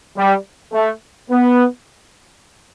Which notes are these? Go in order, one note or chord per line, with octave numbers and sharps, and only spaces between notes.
G3
A3
B3